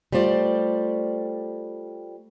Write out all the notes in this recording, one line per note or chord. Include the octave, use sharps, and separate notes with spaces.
G3 A3 F4 C5 D5